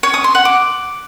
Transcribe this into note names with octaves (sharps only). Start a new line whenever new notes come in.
C#5
D#6
C6
F#5
D6